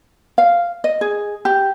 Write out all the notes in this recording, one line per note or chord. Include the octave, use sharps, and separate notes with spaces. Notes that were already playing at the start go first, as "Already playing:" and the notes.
F5
D#5
G#4
G4